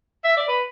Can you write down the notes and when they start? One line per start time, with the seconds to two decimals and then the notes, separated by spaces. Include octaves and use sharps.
0.24 E5
0.37 D5
0.48 B4